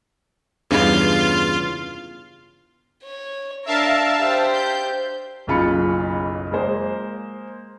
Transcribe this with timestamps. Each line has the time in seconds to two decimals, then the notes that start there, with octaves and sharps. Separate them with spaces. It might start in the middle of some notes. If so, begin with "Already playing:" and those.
0.71 E2 G2 C#3 F4
3.03 C#5
3.66 D4 A#4 E5 F5 A5
4.19 G4 C5
4.53 G6
5.47 F#1 B1 C#3 F4 B5 C#7
6.52 G#3 A#3 C5